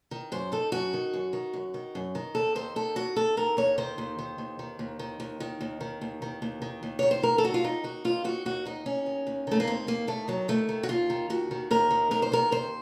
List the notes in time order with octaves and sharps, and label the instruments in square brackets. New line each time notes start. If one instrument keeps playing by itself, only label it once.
[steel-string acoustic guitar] D#3
F#2 C5
D#3 A4
F#2 F#4
D#3
F#2
D#3
F#2
D#3
F#2
D#3
D#2 A4
D#3 C5
D#2 A4
D#3 F#4
D#2 A4
D#3 A#4
D#2 C#5
D#3 C5
D#2
D#3
D#2
D#3
D#2
D#3
D#2
D#3
D#2
D#3
D#2
D#3
D#2
D#3
D#2
D#3 C#5
C5
D#2 A#4
A4
D#3 F#4
F4
D#2 D#4
D#3 F#4
D#2 F4
D#3 F#4
D#2 F#4
D#3 D#4
D#2 C#4
D#3
D#2
D#3 A3
A#3
D#2 C4
D#3 A#3
D#2 A3
D#3 F#3
D#2 A3
D#3
F#4
D#2 F4
D#3
D#2 F#4
D#3
D#2 A#4
D#3
D#2 A#4
C5
D#3 A#4
D#2 C5